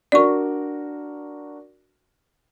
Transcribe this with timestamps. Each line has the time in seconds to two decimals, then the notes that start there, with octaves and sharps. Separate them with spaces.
0.12 D4 F#4 A#4 D5 C#6